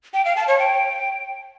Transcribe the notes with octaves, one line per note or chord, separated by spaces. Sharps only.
G5
F5
A5
C#5
G5